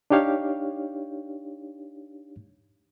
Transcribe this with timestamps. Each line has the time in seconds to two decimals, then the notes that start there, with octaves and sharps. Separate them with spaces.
0.10 D4 D#4 G4 C#5 F5